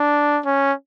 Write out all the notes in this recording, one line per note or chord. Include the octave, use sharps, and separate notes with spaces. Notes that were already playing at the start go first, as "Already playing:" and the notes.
Already playing: D4
C#4